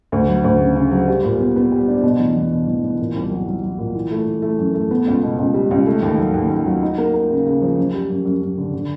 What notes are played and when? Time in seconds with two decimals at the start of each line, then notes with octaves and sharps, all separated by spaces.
0.12 D2
0.28 F#3
0.44 D2
0.60 C#3
0.75 C#3
0.91 F#3
1.08 G3
1.24 A#2
1.40 B3
1.56 B3
1.72 G3
1.88 D4
2.03 B2
2.20 E2
2.36 E2
2.52 B2
2.68 E2
2.84 E2
2.99 A#2
3.16 C2
3.31 F#3
3.47 F#3
3.63 F#3
3.79 A#2
3.95 E3
4.11 A3
4.26 E3
4.42 A3
4.59 F#2
4.74 A3
4.91 B3
5.07 C#2
5.23 B2
5.38 C#2
5.54 G3
5.71 C#2
5.87 A3
6.02 D#2
6.19 F#3
6.34 D#2
6.50 D#2
6.66 F#3
6.83 D#4
6.98 A#3
7.14 A#3
7.30 C#3
7.46 C#3
7.61 F3
7.78 F#2
7.94 G3
8.10 F#2
8.25 F#2
8.41 F#2
8.58 D3
8.73 D3